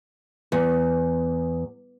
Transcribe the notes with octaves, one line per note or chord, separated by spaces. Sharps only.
E2